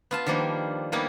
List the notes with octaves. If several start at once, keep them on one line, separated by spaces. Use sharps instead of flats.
B3 F4 A5
D#3 F3 G3 A#3 D4
G3 A#3 B3 D#4 G#4